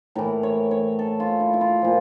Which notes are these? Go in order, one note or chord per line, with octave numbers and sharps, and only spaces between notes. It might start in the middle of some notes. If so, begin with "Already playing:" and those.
A2 E3 A#4
C#5
C#5
A4
F4
E4
E4
F4
A#2 F3